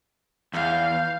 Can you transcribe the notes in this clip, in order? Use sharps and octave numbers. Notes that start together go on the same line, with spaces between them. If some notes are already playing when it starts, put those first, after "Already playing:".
E2 F5 G6